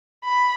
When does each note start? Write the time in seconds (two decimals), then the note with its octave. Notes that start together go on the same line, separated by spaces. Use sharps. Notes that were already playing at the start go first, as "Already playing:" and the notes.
0.25 B5